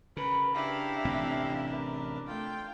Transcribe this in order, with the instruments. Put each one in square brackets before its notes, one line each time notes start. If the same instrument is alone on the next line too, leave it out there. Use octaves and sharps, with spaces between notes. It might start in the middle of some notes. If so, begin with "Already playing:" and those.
[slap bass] C#3 [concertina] A#4 [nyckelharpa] B4
[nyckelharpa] D4 [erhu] E4 [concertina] G4 F5 A#5
[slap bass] A1 C3 C4
[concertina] A#4 B4
[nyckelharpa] A3 [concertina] F4 [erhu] G5